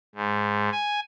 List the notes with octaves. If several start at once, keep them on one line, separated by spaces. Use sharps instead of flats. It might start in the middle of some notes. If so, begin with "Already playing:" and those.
G#2
G#5